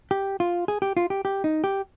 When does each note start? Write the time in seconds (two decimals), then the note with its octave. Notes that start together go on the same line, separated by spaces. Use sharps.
0.11 G4
0.40 F4
0.68 G#4
0.82 G4
0.97 F4
1.10 G4
1.25 G4
1.44 D#4
1.64 G4